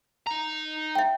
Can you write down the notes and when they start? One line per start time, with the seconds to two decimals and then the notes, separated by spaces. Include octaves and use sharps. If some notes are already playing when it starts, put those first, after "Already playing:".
0.27 D#4 A#5
0.95 E5 G5